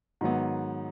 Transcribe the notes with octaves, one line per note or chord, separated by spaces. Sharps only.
G#2 D#3 F#3 B3